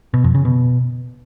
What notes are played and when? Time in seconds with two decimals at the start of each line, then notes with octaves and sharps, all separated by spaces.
0.14 B2
0.24 F2
0.35 C#3
0.45 B2